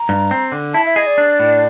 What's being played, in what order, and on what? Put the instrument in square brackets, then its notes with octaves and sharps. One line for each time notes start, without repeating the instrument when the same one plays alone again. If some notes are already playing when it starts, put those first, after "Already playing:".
Already playing: [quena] A#5
[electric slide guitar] G2
C4
D3
[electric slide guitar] E4 [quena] A5
[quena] E5
[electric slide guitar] G#4 [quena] D#5
[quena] D5
[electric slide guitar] D4
A2